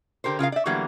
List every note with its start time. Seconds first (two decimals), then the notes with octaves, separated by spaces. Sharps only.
0.24 D3 G4 A#4 C5
0.39 C#3 F4 A#4 F5
0.52 D5 E5
0.66 D3 E3 F#3 G3 A#3 B3